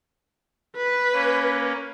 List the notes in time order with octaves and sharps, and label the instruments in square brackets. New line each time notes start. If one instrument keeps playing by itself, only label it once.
[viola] B4
[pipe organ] A#3 C#4